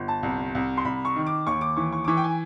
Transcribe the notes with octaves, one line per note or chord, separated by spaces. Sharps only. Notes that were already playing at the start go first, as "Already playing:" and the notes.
Already playing: G1
A5
C2
C2
C6
C2 B5
C#6
D#3
D6
D#2 C#6
D6
E3 C#6
C#6
D6
E3 C#6
G5
G#5